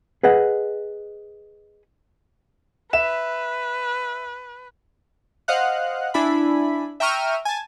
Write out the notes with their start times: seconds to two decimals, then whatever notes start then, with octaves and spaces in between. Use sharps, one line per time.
0.23 G#4 B4 D#5 F#5
2.93 B4 E5 E7
5.48 C5 D#5 F5 F#5 F#6
6.14 D4 E4 G#5 B5
7.00 E5 G5 A#5 C#6 F6 D#7
7.45 G#5 A5